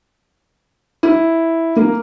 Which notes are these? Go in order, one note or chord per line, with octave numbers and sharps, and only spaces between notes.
E4
A#3